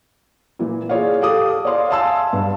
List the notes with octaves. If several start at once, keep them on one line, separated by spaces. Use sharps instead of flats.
A#2 E3
F4 G#4 C#5 D5 F5
G4 A4 F5 D6 D#6
C#5 D5 F5 C6 D#6
E5 F5 G#5 A5 C6 E6
G2